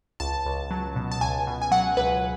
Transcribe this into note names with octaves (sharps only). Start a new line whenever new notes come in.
C#2 A5
C#2
F#3
B2
A5
C#2 G#5
B2
G#5
F#3 F#5
C#2 B4